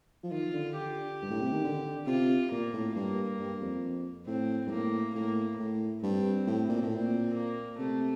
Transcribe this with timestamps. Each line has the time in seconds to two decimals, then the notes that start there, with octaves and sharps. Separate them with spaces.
0.23 F3
0.32 D#3 F4
0.53 D3
0.76 G4
1.23 G2
1.30 A2
1.41 C3
1.52 D#3
1.64 D3
2.07 C3 F4
2.51 A#2 A#3
2.73 A2
2.95 G2 A#3
3.40 G2
3.61 F2
4.27 A2 C4
4.67 G2
4.71 A2 A#3
5.15 A2 A#3
5.59 A2
6.03 G2 C4
6.47 A2
6.69 A#2
6.83 A2
6.91 A#2 C4
7.34 A#3
7.78 C3 A3